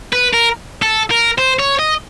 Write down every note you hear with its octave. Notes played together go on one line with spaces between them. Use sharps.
B4
A#4
A4
A#4
C5
C#5
D#5